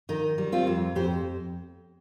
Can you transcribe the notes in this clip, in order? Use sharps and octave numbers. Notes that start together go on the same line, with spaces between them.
D#3 D#4
G3
C4 F4
F2
F2 G4 C5